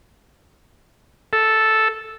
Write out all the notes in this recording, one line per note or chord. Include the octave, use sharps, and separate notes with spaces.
A4